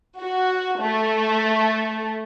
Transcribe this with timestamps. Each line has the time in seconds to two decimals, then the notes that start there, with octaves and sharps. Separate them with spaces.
0.19 F#4
0.81 A3